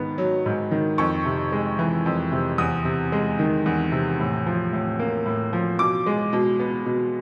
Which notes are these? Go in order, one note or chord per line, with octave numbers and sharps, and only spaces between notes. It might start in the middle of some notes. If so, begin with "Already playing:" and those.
Already playing: G#2 D#3 B3
F#3
G#2
D#3
F2 C#6
C3
G#3
E3
F2
C3
E2 D#6
C3
G#3
D#3
E2
C3
A2
F3
A2
A#3
A2
F3
B2 D6
G#3
B2
B3
B2